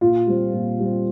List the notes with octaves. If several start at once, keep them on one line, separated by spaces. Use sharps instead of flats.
A#2 F4
G3 C4
A#2
G3 C4